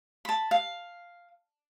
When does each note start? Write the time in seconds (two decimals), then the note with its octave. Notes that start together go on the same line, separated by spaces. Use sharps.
0.25 A5 B5
0.51 F5